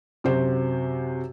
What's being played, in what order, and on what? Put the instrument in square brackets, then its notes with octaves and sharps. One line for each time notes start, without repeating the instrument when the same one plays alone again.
[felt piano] F#2 C3 F#4 C5